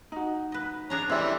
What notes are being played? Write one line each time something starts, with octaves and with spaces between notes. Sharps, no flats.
D#4 F#4
B4 D#5
C#4 D4 G#4 C#5 A#5
E3 G3 C4 G#4 A4 D5 E5 E6